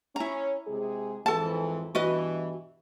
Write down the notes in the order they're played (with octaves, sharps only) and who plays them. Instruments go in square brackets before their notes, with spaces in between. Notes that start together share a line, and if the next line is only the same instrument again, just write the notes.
[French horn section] C#4 [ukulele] E4 A#5
[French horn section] C3 G#3 G#4
[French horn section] F2 G#2 E3 [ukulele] A4 A5
[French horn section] G2 B2 E3 [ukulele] F#4 B4 D#5